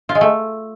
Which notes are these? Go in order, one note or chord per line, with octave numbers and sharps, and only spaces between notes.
F4
G#3
A3